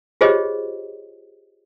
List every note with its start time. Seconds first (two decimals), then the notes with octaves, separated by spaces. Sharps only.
0.21 F4 G4 G#4 C5 C#5 D#5